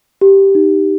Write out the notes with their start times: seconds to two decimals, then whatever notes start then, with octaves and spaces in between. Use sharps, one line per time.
0.21 G4
0.55 D#4